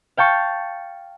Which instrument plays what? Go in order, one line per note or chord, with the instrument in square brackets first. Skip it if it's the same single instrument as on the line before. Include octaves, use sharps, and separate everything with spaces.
[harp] F5 G5 A5 C#6